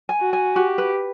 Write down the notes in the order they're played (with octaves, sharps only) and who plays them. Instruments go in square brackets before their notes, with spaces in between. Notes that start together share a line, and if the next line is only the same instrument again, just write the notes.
[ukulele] G#5
[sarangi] F#4
[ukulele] G#5
[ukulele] F#4 [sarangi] G4
[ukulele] B4